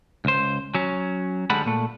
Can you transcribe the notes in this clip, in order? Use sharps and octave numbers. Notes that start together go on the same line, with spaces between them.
C#2 C5
F#3 C#4
D2 G3 G#3 A4 F#5 B5
A#2 A3